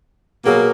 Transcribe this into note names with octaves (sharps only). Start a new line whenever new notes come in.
B2 F#3 A#3 G#4